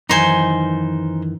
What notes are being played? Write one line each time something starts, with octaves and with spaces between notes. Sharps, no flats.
F#2 D#3 E3 D#4 C5 G#5